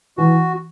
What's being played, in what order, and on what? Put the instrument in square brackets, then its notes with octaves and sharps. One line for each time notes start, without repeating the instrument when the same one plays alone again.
[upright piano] E3 [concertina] F#4